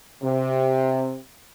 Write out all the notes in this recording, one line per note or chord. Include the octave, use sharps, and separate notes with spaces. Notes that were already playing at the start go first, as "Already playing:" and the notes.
C3